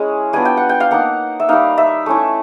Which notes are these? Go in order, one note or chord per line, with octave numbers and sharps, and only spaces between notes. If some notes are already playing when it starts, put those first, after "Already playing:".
Already playing: G#3 C#4 E4
G3 B3 D4 F4 G#5
G5
F#5
G5
F5
A#3 D#4 F#5
E5
G3 A#3 D#4 F5
E5
A3 C#4 E4